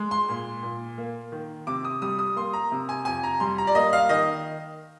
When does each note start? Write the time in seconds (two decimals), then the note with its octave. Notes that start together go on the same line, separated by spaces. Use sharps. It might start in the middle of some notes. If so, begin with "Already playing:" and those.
Already playing: G#3
0.11 C6
0.29 A#2
0.63 A#2
0.98 A#3
1.32 D#3
1.67 C3 D6
1.85 D#6
2.02 G3 D#6
2.19 D#6
2.36 A#3 C6
2.53 A#5
2.72 C3
2.89 G#5
3.05 F2 G#5
3.23 A#5
3.40 G3 C6
3.58 A#5
3.67 D5
3.75 A#3 D#5
3.93 F5
4.09 D#3 D#5